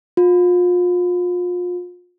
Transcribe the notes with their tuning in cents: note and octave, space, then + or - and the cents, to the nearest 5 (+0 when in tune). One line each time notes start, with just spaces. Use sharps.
F4 +35